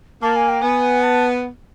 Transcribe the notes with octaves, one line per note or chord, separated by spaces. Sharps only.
A#3 A5
G#5
G5
B3 G#5
A5